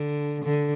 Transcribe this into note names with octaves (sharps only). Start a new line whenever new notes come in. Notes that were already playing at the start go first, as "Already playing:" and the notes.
Already playing: D3
D3